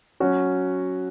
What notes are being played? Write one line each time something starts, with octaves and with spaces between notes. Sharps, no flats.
F#3 C#4 F#4